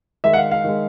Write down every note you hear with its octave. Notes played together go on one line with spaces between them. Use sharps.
D#3 G#3 E5
F#5
F5
F5
D#3 G#3